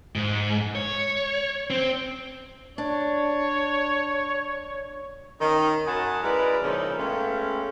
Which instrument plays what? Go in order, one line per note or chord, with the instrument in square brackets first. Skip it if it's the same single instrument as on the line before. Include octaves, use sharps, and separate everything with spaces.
[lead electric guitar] G#2
C#5
C4
[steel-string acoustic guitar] D4 [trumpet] C#5
[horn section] D#3 C#4 D#5
F#2 D#5 F#5 G#5 A5 B5
G#3 E4 A#4 B4 D5 D#5
A#2 C#3 F3 C#4 D#4 E4
G#3 A3 B3 C#4 F5 G5